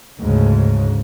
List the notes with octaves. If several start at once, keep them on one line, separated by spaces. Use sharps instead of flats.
D2 G#2 C#3